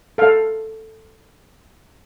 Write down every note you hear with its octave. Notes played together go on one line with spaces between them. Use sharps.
A4 F5